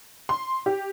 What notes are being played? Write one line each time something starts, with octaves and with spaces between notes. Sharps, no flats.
C6
G4